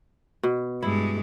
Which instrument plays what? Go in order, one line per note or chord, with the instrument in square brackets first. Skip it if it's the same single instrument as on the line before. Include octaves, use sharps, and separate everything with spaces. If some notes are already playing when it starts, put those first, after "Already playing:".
[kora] B2
[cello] G2 G#3 [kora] E4